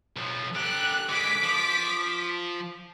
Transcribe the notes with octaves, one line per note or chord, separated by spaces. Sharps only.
B1 F3
D3 G4 F#6
D3 G#3 D6 B6
F3